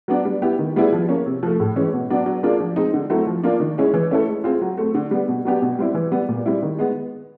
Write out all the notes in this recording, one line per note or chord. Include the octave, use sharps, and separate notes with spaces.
F#3 B3 D4
G3
B3 E4 G4
D#3
G3 B3 E4 G#4
F3
A#3 C#4
C3
F3 A3
A2
E3 G#3 C#4
B2
F#3 B3 D4
F#3
A#3 D4 F4 G#4
F3
G#3 C4 D#4
D3
F#3 A3 C4 E4
F3
A#3 D4 F4
D#3
G#3 C#4 E4 G#4
E3
A3 C#4 E4 A4
G#3
C4 F4 G#4
F#3
A3 C4
D3
G3 B3
B2
F#3 B3 D4 G4
B2
G3 C4 E4
E3
G3 B3
A#2
G3 C4 E4
D#3
G#3 B3